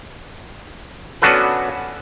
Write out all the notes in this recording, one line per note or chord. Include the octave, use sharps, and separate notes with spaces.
B3 C#4 D4 F#4 A4 B4